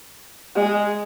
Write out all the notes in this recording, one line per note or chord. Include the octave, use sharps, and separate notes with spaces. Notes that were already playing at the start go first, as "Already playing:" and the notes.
G#3